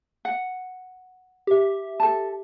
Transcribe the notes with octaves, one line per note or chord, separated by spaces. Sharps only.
F#5
G4 E5
A4 A5